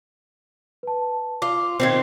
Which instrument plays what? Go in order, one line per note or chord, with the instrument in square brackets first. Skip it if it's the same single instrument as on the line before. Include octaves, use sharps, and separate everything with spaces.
[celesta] B4 A5
[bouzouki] F4 [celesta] D6
[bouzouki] A#2 D#3 C4 [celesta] G#6 C7